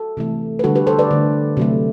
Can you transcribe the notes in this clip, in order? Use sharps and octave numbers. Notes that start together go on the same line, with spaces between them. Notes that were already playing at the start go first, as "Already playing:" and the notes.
Already playing: F#4 A4
C3 E3 A3
B4
D3 G3 F#4 A4
G4 B4
A4 C5
B4 D5
D3 A3
C3 F#3 A3